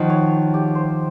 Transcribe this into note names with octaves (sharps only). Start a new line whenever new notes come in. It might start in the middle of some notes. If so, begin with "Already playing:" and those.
Already playing: D#3 F3 D#4 F#4
C#5
C#5
G4
C5